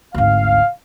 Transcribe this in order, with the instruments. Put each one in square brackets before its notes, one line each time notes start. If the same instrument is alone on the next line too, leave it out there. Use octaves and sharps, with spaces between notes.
[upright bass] G#1 D2 [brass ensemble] F5